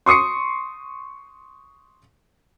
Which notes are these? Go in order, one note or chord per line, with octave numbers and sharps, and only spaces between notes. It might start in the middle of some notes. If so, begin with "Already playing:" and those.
C6 C#6 D#6 C7 C#7